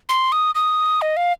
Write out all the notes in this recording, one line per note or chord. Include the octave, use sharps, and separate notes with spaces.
C6
D#6
D#6
D#5
F5